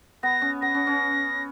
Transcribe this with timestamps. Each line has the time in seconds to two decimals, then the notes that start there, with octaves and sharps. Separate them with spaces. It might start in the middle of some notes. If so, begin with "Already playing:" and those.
0.23 B3 A#6
0.42 C#4
0.62 B3 A#6
0.75 C#4
0.87 C#4